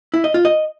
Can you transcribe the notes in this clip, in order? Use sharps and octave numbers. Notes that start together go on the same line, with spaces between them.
E4
D#5
F4
D#5